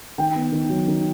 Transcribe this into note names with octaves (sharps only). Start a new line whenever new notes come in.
D#3 G5
B3
D#3
F#3
D#3